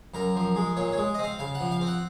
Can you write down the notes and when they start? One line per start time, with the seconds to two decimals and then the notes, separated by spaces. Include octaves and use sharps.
0.14 F#2 A#4
0.36 F3
0.56 G#3
0.77 A#2 C#5
0.92 C#5
0.98 G#3
1.14 C4 D#5
1.23 F5
1.39 C#3 F5
1.55 F#5
1.60 F3
1.71 F5
1.81 C4
1.87 F#5